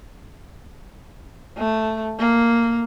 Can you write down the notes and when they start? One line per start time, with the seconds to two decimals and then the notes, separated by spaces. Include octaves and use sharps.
1.58 A3
2.19 A#3